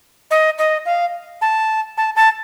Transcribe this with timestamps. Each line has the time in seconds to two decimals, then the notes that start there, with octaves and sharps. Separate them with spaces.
0.31 D#5
0.58 D#5
0.86 F5
1.41 A5
1.97 A5
2.16 A5